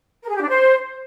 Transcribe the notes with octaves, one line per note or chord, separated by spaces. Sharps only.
A#4
G#4
G4
D4
C5